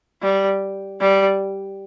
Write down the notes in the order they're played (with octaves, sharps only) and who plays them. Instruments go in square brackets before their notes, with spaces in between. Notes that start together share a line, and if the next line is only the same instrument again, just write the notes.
[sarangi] G3
G3